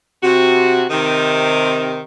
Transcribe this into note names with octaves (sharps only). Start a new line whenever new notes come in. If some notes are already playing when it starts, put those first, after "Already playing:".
C3 F#4
C3 D#3